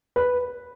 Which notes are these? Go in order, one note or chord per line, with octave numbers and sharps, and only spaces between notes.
B4